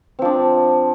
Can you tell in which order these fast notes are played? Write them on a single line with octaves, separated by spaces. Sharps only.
C4 F3 D4